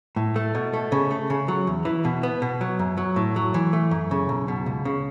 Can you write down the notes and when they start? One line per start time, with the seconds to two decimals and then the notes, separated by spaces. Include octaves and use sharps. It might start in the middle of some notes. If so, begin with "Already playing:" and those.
0.16 A2
0.36 A3
0.55 B2
0.73 A3
0.92 C#3
1.11 A3
1.30 C#3
1.48 F#3
1.67 E2
1.85 E3
2.05 B2
2.23 B3
2.42 B2
2.61 F#3
2.79 F#2
2.98 F#3
3.16 A2
3.36 F#3
3.54 E3
3.73 A3
3.91 F#2
4.11 C#3
4.29 B1
4.48 B2
4.66 C#2
4.85 C#3